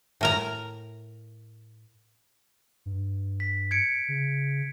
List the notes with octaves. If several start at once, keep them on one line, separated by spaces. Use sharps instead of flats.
A2 A#4 A#5
G2
B6
G#6 C#7 D7
C#3